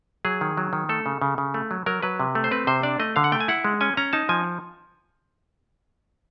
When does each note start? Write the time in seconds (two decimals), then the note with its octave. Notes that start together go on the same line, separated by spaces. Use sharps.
0.25 F#3 G#4
0.41 D#3
0.57 F#3
0.73 D#3
0.89 A3 A4
1.06 C#3
1.22 C#3
1.38 C#3
1.54 A3
1.71 F#3
1.86 F#3 A#4
2.02 F#3 B4
2.20 C3
2.35 A3
2.44 C5
2.51 C4 B4
2.67 C3 C5
2.83 D4 D5
3.00 A3 D#5
3.16 D3 F5
3.24 F#5
3.32 A3 G5
3.40 G#5
3.48 E4 F#5
3.64 G#3
3.81 C#4 G#5
3.97 C#4 A#5
4.13 D#4 A5
4.29 F3 G#5